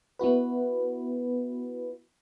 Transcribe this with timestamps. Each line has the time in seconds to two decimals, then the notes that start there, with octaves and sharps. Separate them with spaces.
0.19 B3 E4 F#4 B4